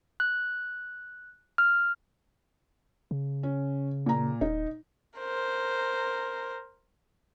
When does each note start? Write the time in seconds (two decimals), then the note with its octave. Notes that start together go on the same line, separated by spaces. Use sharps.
0.20 F#6
1.58 F6
3.11 C#3
3.43 C#4
4.06 A#2 A#5
4.41 D#1 D#4
5.18 A#4 C5